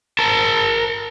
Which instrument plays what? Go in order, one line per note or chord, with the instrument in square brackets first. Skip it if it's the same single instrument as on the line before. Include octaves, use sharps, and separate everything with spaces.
[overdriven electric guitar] A#4 A5